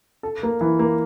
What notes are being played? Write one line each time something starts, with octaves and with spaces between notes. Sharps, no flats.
A4
A#3
E3
A#3